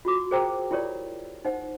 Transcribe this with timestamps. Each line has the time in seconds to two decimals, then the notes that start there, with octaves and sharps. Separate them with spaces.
0.05 F4 F#4 D6
0.31 G#4 A#4 C5 G5 A#5 E6
0.71 E4 F4 G4 A#4 C#5 D5
1.45 D#4 C5 F#5